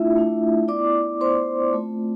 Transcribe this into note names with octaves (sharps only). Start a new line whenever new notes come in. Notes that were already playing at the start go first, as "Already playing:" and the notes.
Already playing: A3 D4 E4 F4 E5
A3 D4 F4
B3 E4 D5 D6
B3 E4 C5 C6
A3 C4 F4